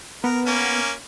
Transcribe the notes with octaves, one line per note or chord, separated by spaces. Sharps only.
B3 A#4
A#3 C#4